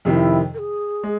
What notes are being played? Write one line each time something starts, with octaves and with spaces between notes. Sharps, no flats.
F2 C3 D#3 E4 G#4
A#4
G#4
G#3